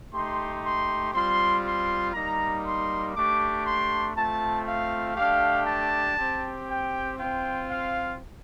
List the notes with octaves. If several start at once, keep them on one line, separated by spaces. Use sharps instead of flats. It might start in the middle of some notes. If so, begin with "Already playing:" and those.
A3 D#4 G4 C6
C6
G3 C4 F4 C6
C6
G3 A#3 D#4 A#5
C6
A3 D4 G4 D6
C6
A3 C4 F4 A5
F5
A3 D4 G4 F5
A5
C4 G4
G5
C4 F4 G5
F5